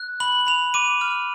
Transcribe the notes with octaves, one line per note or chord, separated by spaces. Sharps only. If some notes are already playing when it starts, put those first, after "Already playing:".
Already playing: F#6
B5 F#7
B5 F7
D6 D#7
F6